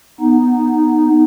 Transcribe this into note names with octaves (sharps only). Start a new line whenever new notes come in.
B3 D#4